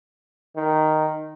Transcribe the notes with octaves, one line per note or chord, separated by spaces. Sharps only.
D#3